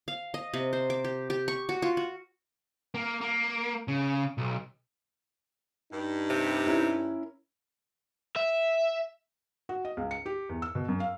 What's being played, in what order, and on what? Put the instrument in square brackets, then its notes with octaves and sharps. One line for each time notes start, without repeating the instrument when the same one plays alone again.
[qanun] F5
D#5
C3
C5
D6
G4
G4
C#6
F#4
F4
F#4
[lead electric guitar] A#3
A#3
C#3
B1
[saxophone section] G2 [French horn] D#4
[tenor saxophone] C3
[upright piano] C#4 E4 A#4
[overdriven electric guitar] E5
[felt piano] F#4
D#5
C#2
C#7
G4
E2
E6
B2
F#2
F5